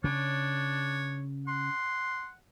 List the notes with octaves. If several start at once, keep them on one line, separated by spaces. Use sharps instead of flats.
C#3 D4 C#5
F#5 C6